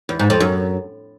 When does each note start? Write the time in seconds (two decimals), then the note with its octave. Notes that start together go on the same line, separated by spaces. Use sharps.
0.09 E2
0.19 G#2
0.30 F2
0.40 F#2